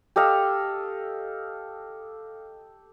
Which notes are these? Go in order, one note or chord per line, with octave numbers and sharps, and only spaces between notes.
G4 A4 D#5 F5